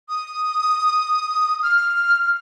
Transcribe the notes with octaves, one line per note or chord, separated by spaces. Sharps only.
D#6
F6